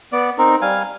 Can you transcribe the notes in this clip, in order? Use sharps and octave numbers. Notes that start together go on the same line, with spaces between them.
B3 D5
C4 D#4 A#4
G3 F5 G#5